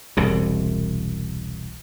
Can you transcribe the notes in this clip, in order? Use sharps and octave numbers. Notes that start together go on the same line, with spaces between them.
E1 C2 C3